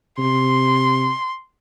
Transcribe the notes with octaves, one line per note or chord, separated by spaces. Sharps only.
C3 C6